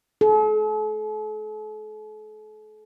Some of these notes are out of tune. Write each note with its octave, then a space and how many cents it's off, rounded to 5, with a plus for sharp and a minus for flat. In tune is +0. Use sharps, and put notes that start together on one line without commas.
A4 -45